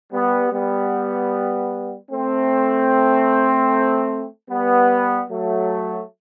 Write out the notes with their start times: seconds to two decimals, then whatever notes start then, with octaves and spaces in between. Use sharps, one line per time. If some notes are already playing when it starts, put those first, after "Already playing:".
0.12 G3 B3
0.52 G3 B3
2.11 A3 C4
4.49 G3 B3
5.29 F#3 A3